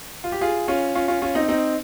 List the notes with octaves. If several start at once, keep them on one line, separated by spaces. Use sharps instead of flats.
F4
G4
F4 G#4
C#4 F4
C#4 F4
C#4 F4
C#4 F4
C4 D#4
C4 D#4